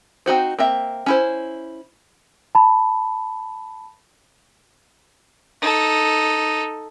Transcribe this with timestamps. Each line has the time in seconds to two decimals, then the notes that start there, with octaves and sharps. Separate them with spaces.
0.26 C4 D#4 F#4 C5
0.59 A#3 C4 E5
1.06 C#4 E4 C5
2.55 A5 B5
5.62 D#4 A4